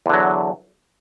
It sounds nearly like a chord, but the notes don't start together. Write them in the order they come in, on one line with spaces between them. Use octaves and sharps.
E2 D3 F#3